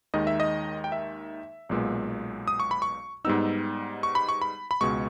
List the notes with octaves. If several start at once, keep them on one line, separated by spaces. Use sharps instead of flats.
D#2 D#3 G#3 D#4 D#5
E5
D#5
G5
E5
B1 A#2 G#3 B3
D#6
C#6
B5
C#6
G#2 G3 B3 D#4 E6
C#6
B5
C#6
B5
B5
C#2 B2 G#3 C#6